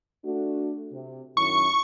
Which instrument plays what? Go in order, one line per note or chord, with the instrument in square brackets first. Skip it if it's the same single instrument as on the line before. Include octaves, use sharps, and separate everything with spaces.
[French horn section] A3 D4 F#4
C3
[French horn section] F#2 D#3 E4 [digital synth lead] C#6